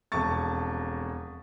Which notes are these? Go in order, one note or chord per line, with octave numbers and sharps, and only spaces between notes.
E1 F2 A5 C#6 A6